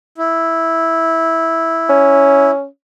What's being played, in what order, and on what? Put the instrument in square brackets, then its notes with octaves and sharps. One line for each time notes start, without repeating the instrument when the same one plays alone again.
[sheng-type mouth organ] E4
[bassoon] C#4